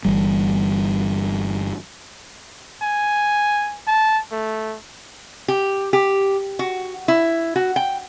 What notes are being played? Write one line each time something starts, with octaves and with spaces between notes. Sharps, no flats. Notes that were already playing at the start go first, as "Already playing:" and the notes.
G1 E3 G3
G#5
A5
A3
G4
G4
F#4
E4
F#4
G5